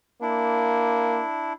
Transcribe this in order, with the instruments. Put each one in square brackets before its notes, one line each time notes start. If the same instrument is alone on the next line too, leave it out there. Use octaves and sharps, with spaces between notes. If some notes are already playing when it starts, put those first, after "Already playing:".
[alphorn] A#3 [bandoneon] D4 E4